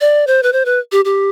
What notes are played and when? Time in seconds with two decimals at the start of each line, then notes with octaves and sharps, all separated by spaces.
0.01 D5
0.27 C5
0.43 B4
0.53 C5
0.65 B4
0.92 G4
1.05 G4